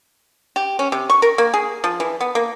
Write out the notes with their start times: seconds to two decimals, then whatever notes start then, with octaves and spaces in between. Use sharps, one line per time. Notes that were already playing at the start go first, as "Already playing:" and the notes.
0.56 G4
0.79 C#4
0.92 C3
1.10 C#6
1.22 A#4
1.38 A#3
1.54 G#4
1.84 F3
2.00 E3
2.21 B3
2.35 A#3